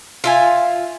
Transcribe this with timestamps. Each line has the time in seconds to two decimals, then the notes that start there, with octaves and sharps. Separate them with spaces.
0.24 F4 E5 G#5